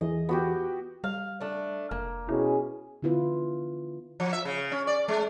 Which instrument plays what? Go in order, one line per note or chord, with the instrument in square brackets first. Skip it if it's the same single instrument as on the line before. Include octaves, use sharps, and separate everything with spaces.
[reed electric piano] E2 E3 G#4 [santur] D#5
[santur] B3 F#4 G4
[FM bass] G3 [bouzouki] F5
[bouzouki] A3 D4
[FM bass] F1 [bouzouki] A#3
[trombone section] B2 C#4 G#4 [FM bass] E4
[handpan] D3 B3 E4 F4 B4
[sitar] F3
E5
C#3
C#4
D5
G#3